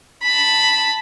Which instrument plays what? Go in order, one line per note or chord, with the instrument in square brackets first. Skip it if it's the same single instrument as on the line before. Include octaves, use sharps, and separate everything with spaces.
[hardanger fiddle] A5 B5